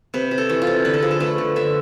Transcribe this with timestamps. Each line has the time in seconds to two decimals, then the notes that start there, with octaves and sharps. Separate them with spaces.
0.14 C3 B4
0.31 C3
0.38 A4
0.49 E3
0.62 F4
0.67 C3
0.85 D3 B4
0.94 A4
1.02 F3 G#4
1.11 A4
1.20 A3 B4
1.38 D3
1.56 D3 E5